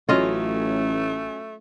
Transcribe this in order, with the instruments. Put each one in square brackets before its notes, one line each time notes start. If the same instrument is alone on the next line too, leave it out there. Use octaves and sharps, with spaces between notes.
[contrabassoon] A1 [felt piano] F#3 C#4 [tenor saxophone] A3 [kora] F4 D#5 F5